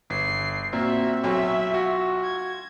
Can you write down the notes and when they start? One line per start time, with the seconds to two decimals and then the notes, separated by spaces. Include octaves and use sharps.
0.10 G1 C7
0.73 A#2 C4 F#4 E5
1.24 B1 F#3 E5
1.70 F4 F#4
2.23 G#6